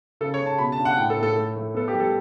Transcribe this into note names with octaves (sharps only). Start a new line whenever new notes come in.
C#3 A4
C#5
C#3
A5
B2 B5
A5
D4
F#5
A2 G5
A4
A2
A4
A3
A3
B3 A4
G4
G3
A4